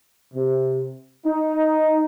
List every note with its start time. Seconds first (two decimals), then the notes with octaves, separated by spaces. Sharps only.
0.33 C3
1.24 D#4